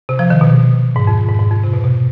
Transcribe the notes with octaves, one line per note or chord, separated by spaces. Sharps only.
C3
F3
D#3
B2
G#2
F2
G#2
G#2
F2
C3
B2
B2